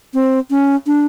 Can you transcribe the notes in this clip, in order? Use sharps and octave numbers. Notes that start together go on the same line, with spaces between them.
C4
C#4
D4